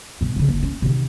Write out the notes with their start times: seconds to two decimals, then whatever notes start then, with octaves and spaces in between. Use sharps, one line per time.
0.21 G2 B2
0.36 C#3 F3
0.48 F#1
0.63 C#4
0.82 C3 D#3